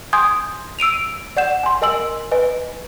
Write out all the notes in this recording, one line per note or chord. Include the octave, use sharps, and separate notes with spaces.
G#5 C6 D#6 G6 G#6
E6 D7 D#7 F7
D5 F#5 G6 E7
G#5 C6
A#4 D#5 G#5 E6 F#7
B4 D#5 G#5